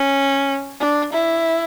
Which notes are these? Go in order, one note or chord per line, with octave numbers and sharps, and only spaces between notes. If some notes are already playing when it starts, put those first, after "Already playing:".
Already playing: C#4
D4
E4